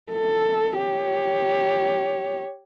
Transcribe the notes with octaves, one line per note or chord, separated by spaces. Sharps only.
A4
G4 C#5